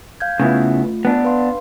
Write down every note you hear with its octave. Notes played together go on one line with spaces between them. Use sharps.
F5 G6 G#6
C#3 A3 B3 E4 F4
B3 D4
B4 F5 C6